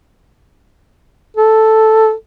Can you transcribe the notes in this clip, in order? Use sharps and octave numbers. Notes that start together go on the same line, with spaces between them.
A4